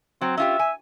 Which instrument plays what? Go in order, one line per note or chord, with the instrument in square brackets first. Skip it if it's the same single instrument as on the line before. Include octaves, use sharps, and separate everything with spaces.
[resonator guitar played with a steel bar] F#3 [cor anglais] C4
[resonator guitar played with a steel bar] C#4 F4 G4 [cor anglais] E5
[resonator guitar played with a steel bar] G#5